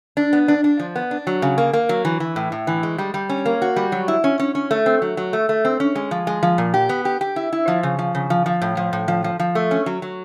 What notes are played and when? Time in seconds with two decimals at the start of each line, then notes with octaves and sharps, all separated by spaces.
0.17 D4
0.33 B3
0.48 D4
0.64 D4
0.80 F3
0.96 B3
1.11 D4
1.27 F#3
1.42 C#3
1.58 A#3
1.73 A#3
1.89 F#3
2.05 E3
2.20 E3
2.36 A2
2.52 A2
2.67 E3
2.83 G#3
2.98 G3
3.14 G3
3.29 C#4
3.46 A#3
3.62 F#4
3.76 G3
3.92 F#3
4.08 E4
4.24 C#4
4.39 C#4
4.55 C#4
4.71 A3
4.86 C4
5.02 F#3
5.17 F#3
5.33 A3
5.49 A3
5.65 C4
5.80 C#4
5.95 G#3
6.11 F3
6.27 G#3
6.43 F3
6.58 A#2
6.74 G4
6.89 B3
7.05 G4
7.21 G4
7.36 E4
7.53 E4
7.68 F3
7.83 C#3
7.99 F3
8.15 C#3
8.30 F3
8.46 F3
8.62 A2
8.77 F3
8.93 A2
9.08 F3
9.24 F3
9.39 F3
9.55 A3
9.71 C#4
9.86 F#3
10.02 F#3